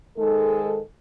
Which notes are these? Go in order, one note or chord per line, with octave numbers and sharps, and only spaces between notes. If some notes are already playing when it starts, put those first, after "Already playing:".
G#2 D#3 G#3 A4